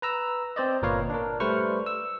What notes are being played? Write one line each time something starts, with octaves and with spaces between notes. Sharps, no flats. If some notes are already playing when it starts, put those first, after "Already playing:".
B4 A#5 E6
C4 C5 D5 D#5
G1 A#2 A#4 B4 C#5 F5
D4 A#4
G3 A3 B4 C5 C#6 F6
E6